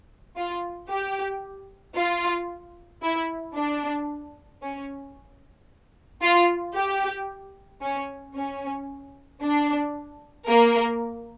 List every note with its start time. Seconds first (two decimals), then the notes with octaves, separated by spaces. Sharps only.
0.37 F4
0.90 G4
1.96 F4
3.02 E4
3.56 D4
4.63 C#4
6.21 F4
6.75 G4
7.82 C#4
8.35 C#4
9.41 D4
10.47 A#3 A#4